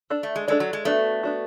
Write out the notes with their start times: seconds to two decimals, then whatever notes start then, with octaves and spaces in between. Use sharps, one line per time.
0.10 D4 A4 D5
0.23 A3
0.36 G#3
0.48 G#3 D4 A4 D5
0.60 F#3
0.73 G#3
0.85 A3 B3 D4 F#4
1.23 B3 D4 F#4